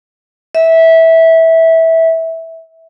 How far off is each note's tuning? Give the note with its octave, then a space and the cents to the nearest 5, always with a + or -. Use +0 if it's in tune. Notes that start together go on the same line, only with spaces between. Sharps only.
E5 -15